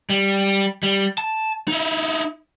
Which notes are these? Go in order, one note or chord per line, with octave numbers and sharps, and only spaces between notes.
G3
G3
A5
D#4 E4